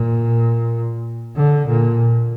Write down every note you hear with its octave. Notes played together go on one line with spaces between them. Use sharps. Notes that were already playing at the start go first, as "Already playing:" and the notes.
Already playing: A#2
D3
A#2